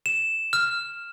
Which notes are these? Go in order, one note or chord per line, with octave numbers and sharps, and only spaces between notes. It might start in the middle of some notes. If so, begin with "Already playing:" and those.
E7
F6